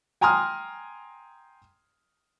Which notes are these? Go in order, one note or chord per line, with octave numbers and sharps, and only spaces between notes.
G5 G#5 A#5 C6 D#6 F6